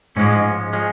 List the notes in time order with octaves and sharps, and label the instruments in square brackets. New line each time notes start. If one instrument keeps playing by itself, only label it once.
[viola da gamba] G#2 [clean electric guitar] F3 G#3 C#4
[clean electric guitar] F3 G#3 C#4